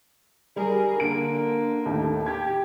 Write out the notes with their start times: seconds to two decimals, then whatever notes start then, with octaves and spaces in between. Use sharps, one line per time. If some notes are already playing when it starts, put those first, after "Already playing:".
0.56 G3 G#4 A#4
1.00 D3 A#3 D7
1.86 D#2 A2
2.26 G4 G#6